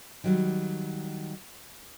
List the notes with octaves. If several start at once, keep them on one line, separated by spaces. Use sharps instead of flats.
D#3 F#3 G3